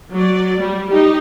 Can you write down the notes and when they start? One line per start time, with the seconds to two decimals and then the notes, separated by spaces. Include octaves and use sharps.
0.11 F#3 D5
0.59 G3
0.89 D#4 G4